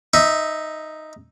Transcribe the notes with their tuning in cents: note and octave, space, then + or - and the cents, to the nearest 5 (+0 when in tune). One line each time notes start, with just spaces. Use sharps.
D#4 +0 E5 -15